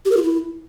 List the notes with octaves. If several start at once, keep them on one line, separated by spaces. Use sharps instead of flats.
G4
A#4
F4
E4